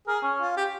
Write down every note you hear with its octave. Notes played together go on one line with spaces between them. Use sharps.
G#4 A#4
C#4
F4
G4